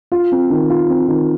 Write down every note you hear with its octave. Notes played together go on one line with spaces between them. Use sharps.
F4
C4
D#3
F4
C4
D#3